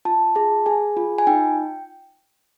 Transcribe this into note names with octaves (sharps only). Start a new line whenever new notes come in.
F4 A5
G#4 A5
G#4 G#5
F4
G#5
D#4 G5